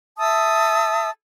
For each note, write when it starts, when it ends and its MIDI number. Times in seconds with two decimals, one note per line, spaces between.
0.18 1.09 76
0.18 1.09 81
0.18 1.09 87
0.18 1.09 88